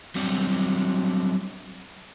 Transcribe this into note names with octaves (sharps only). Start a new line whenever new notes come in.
F#3 G3 C4 D4 F#4